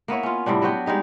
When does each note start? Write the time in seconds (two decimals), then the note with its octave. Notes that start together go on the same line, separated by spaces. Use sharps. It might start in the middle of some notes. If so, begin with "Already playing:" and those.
0.08 A#3 B3 E4 C#5
0.23 C#4 F4
0.46 A2 C3 G3 D4
0.62 F#3 B3 F#4 G5
0.86 G3 G#3 D#4 G4